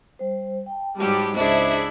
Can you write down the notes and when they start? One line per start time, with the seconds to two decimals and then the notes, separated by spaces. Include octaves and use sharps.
0.19 G3 C5
0.66 G5 A5
0.98 G#2 F#3 G3 G4 A5
1.35 C#2 D4 E4 G#4 C5 D#5 E5 A5